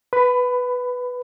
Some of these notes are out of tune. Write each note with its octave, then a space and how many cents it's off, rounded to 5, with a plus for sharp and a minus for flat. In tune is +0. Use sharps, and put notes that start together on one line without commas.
B4 +0 B5 +20